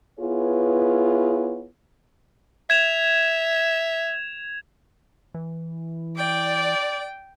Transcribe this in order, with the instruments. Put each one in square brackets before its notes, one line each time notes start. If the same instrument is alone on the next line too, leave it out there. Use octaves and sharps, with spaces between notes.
[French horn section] B3 E4 F4 G#4 B4 C#5
[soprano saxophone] E5 [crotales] G#6 E7 F7
[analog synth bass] E3
[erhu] D5 [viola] G5